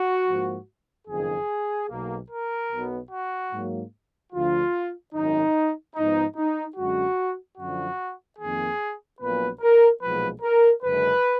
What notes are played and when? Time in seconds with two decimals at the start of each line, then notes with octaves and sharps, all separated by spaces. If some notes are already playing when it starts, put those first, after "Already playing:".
Already playing: F#4
0.27 G#2 F3 A#3
1.08 F#1 F2 D#3 G#4
1.90 B1 B2 A#3
2.31 A#4
2.71 B1 B2 F#3 B3
3.11 F#4
3.52 G#2 F#3 A#3
4.33 D2 D3 F3 F4
5.14 G#1 F#2 D#3 D#4
5.96 G#2 F3 B3 D#4
6.36 D#4
6.77 F#2 D3 G#3 F#4
7.58 F#2 D3 F3 F#4
8.39 F2 D#3 A#3 G#4
9.21 A#1 A#2 F#3 B3 B4
9.61 A#4
10.01 B1 A#2 F3 G#3 B3 B4
10.42 A#4
10.83 F#1 F#2 D3 G#3 B4